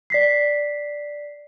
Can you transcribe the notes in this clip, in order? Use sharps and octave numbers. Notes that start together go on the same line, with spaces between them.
D5 B6 C7